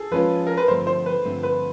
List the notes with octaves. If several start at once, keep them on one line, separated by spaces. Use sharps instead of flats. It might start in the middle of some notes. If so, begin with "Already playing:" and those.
Already playing: G#4 A4
F3 G#3 C#4 F4 B4
A#4
B4
G2 D3 F3 A3 C4 C5
C5
B4
G2 D3 F3 A3 C4
B4